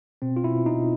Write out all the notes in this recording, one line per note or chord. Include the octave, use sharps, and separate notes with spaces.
B2 C4
F4
B2 E4
B2 D#4